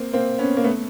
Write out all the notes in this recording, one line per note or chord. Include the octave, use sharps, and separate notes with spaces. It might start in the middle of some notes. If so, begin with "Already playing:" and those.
Already playing: A#3 C4
A#3 C4
B3 C#4
A#3
A3 B3